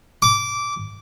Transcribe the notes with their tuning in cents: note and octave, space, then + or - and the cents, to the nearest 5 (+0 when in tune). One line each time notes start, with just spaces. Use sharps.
D6 -15